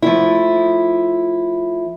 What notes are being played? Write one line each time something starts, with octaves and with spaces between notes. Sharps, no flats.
F3 A3 E4